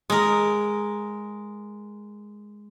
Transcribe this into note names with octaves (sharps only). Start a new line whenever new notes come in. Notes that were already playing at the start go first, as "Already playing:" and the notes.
G#3 A#4